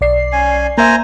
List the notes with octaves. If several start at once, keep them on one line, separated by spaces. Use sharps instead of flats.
B1 D5 C7
C#4 G#5
A#3 C5 E5 G#5 A#5